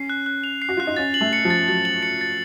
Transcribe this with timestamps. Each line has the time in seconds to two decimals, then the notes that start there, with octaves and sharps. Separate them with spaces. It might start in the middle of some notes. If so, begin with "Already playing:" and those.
Already playing: C#4 C7
0.10 F#6
0.26 F#6
0.44 F7
0.62 C7
0.69 F#4
0.77 F4 F#6
0.87 D#4
0.97 C#4 A6
1.14 F#7
1.21 A3
1.33 C#7
1.45 F3
1.50 A6
1.68 F#3 A6
1.85 F#7
2.03 C#7
2.21 A6